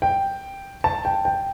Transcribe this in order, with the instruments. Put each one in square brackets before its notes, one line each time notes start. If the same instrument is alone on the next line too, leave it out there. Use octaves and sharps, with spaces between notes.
[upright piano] G5
A5
G5
G5